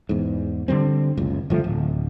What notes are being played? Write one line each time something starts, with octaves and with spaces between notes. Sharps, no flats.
E2 G#2
D3 D#3 G3 C4
F#1 C#2
G1 F3 A3
D1